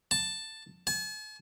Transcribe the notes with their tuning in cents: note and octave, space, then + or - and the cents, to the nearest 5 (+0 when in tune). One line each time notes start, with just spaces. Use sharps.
A5 +5
A5 -45